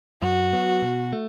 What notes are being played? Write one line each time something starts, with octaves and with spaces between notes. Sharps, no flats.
F#2 F#4
F#3 B3
B2
A3